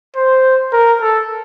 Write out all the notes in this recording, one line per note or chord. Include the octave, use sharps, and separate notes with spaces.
C5
A#4
A4